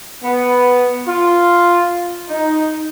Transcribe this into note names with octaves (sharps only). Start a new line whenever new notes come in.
B3
F4
D#4